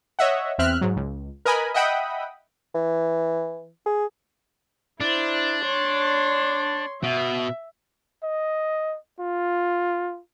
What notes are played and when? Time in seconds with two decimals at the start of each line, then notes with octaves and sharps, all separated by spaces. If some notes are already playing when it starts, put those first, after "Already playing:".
0.19 C#5 D#5 E5 F#5
0.58 E2 C4 E5 F6 F#6
0.81 G#2 F#3
0.96 C#2
1.45 A#4 B4 D#5 G#5 B5
1.74 D#5 E5 F#5 G5 B5 D#6
2.75 E3
3.86 G#4
5.01 D4 E4 C5
5.65 C#5 C6
7.03 B2 E5
8.23 D#5
9.20 F4